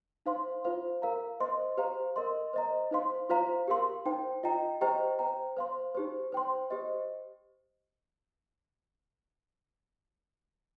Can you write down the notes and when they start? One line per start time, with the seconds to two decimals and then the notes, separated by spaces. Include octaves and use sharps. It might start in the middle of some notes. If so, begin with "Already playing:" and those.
0.26 D#4 C5 F5 C6
0.64 F4 C5 F5
1.02 A#4 F5 A#5
1.40 C5 D#5 C6
1.77 G4 C5 F5 A#5
2.16 A#4 D#5 C6
2.53 C5 D#5 A#5
2.91 D#4 C5 F5 C6
3.29 F4 C5 F5 A#5
3.68 G4 A#4 F5 C6
4.06 D#4 C5 G5
4.43 F4 D#5 G5 A#5
4.81 G4 C5 D#5 G5 A#5
5.19 C5 G5 A#5
5.57 C5 F5 C6
5.95 D#4 G4 C5
6.32 C5 G5 C6
6.70 G4 C5 D#5